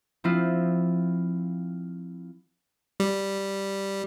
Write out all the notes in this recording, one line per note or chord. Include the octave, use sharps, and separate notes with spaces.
F3 C4 E4 F4
G3